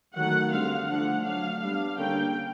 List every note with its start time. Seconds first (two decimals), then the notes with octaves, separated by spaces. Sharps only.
0.15 D#3 F#3 A3 F#5
0.52 D3 G3 C4 F5
0.88 D3 F3 A3 D4 F#5
1.24 F#3 A3 D4 F5
1.61 G3 B3 D4 F5
1.98 D3 G3 A#3 C#4 G5